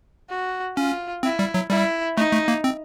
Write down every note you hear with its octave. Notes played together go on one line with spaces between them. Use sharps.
F#4
C#4 F4
C4 E4
G3
F#3
G3 E4
A3 D#4
A3
A#3
C4